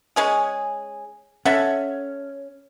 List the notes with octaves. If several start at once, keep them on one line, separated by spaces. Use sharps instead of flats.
G#3 C#4 G#4
C#4 A4 E5 F#5